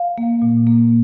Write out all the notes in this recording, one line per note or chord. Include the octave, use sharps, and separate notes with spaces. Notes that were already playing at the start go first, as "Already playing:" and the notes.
Already playing: F5
A#3
A#2
A#3